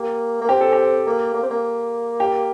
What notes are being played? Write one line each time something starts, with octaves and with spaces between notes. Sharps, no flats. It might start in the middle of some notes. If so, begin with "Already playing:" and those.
Already playing: A#3 G4
A#3
C4 G4
A4
G4
A#3
A#3
C4
A#3
G4